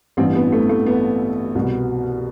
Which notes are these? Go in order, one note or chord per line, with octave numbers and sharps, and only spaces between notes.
A1 G2 E3 C4
B3
A3
A3
B3
C2 B2